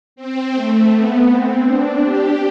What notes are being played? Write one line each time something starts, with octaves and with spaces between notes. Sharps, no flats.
C4
A3
B3
C4
D4
G4